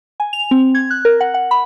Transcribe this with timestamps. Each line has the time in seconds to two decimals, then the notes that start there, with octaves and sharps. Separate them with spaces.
0.20 G#5
0.33 F7
0.51 C4
0.75 G#6
0.91 F#6
1.05 A#4
1.21 F#5
1.34 F#5
1.51 B5